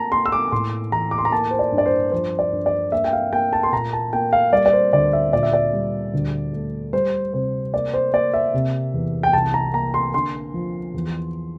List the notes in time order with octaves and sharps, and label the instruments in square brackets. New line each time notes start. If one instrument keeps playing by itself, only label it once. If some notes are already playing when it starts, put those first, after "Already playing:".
Already playing: [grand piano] A#3 A5 A#5
A#3 C6
E6
D6
A2 C6
E3 A#5
D6
C6
A#5
A#3 A5
C5
D5
G2
D5
C5
F3 C5
D5
G2
D5
A#3 E5
G5
F5
A#3 G5
A5
C6
A#2 A#5
A5
A#3 G5
F5
G3 D5
D5
C5
D2 D5
E5
A#2 D5
E5
D5
G3
D2
A3
G3 C5
C3 C5
A#3 D5
C5
A#3 D5
E5
C3
E2
G5
C2 A5
A#5
A#3 A#5
C6
D3 C6
F3
E2